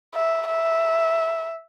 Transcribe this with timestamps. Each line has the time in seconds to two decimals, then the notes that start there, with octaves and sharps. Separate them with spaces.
0.14 E5
0.48 E5